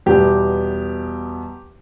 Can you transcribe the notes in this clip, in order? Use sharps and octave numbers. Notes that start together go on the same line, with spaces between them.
E2 B2 G3 B3 G4